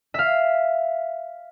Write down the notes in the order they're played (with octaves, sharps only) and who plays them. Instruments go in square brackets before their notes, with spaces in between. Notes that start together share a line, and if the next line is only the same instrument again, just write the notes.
[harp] E5 F5